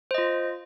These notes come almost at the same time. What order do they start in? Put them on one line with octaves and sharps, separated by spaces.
C5 D#5 F4